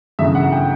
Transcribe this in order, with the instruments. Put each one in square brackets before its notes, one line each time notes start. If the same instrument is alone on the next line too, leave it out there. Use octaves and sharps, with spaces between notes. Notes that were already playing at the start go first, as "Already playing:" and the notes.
[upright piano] G1 F#2 C#3 E3 E5
F#5
G5